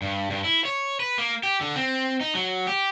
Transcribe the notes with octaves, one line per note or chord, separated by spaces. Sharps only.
G2
G2
E4
C#5
B4
A#3
G4
D3
C4
D#4
F#3
G4